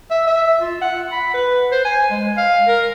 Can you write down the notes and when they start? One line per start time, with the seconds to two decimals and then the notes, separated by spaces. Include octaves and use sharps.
0.10 E5
0.27 E5
0.59 F4
0.81 F#5
1.12 B5
1.34 B4
1.71 C5
1.85 G#5
2.11 G#3
2.37 F5
2.68 A#4